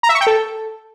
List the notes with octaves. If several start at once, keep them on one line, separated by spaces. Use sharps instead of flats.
A#5
E5
C#6
G5
A4